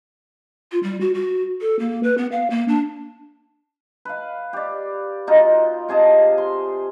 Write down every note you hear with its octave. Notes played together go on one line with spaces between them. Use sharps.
F4
G3
F#4
F#4
A4
A#3
B4
B3
F5
A#3
D4
B4 F5
G4 D5
B2 D#4 F4 A#5
C3 G#4 D#5 A5
C6